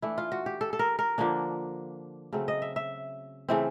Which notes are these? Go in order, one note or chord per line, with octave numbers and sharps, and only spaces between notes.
E3 A3 D4 E4
F4
F#4
G4
A4
A4
A#4
A#4
D3 F3 A#3 D4
C#3 F#3 A3 C4
D#5
E5
E5
C#3 E3 A3 C4